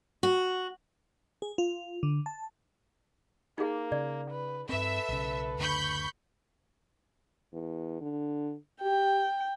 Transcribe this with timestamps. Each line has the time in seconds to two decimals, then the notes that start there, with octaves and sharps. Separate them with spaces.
0.23 F#4
1.42 G#4
1.58 F4
2.03 D3
2.26 A5
3.58 A#3 D#4 G#4
3.92 C#3 D5
4.31 B4
4.69 G2 C4 A4 B4 E5
5.09 B1 C#3
5.58 F#1 D2 D3 B5 C#6 G6
7.53 E2
8.01 D3
8.82 G4 G5